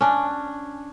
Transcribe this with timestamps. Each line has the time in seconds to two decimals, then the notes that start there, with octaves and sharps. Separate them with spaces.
0.01 C#4 D4